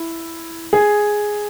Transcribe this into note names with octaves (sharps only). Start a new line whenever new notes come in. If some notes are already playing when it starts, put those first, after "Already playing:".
Already playing: E4
G#4